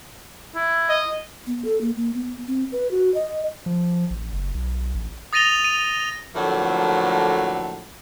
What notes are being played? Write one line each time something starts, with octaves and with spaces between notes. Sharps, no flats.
E4
D#5
B3
A4
A#3
A#3
B3
C4
B4
F#4
D#5
F3
A1
F#1
B1
A1
D#6 A6 A#6 D#7 F7 G7
D#7
A2 D3 F3 F#3 A3 A#3